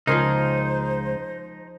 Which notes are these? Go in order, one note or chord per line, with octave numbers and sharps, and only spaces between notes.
C#2 C#3 F3 D#4 G#4 A#4 C5 C6